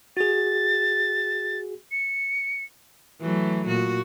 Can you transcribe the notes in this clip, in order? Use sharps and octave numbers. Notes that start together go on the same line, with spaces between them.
F#4 G#4 A6
C#7
E3 F#3 A3
A#2 F#4